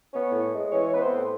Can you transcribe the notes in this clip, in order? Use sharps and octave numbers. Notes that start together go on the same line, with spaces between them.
B3 C#4 C#5
A2
G#3
E3 C#4 C#5
B3 B4
C4 C5
A2